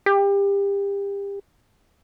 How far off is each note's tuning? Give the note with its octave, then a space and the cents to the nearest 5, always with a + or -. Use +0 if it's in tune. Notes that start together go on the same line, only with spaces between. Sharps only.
G4 +30